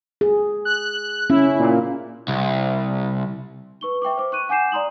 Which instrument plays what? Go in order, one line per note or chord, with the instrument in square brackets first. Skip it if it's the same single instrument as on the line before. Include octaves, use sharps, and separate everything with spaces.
[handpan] G#4
[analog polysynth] F#6
[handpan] C#4 [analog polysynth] E4
[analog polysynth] A#2
[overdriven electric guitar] C2
[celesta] B4 C#6 G7
E5 G5 C#6 D6
C5 D6
C#6 F#6 D#7
F#5 G#5 D6 G6 C7 E7
D5 A#5 C6 D#6 F#7